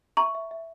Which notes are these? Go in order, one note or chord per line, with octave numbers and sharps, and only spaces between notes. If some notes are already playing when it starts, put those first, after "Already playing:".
E5 A#5 C#6
E5
E5